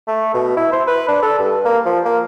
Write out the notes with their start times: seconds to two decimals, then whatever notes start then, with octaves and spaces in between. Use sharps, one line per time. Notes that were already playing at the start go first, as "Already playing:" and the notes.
0.07 A3
0.34 B2
0.57 E4
0.72 C5
0.87 B4
1.08 D4
1.23 A4
1.39 G2
1.65 A#3
1.85 F3
2.05 A#3